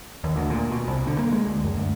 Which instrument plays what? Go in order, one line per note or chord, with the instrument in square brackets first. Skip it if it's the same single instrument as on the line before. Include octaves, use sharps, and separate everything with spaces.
[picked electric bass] D#2
D2
A#2
B2
C2
D3
A#3
G#3
D2
F#2
D2